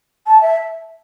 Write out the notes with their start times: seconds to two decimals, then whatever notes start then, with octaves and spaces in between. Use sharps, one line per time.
0.27 A5
0.41 E5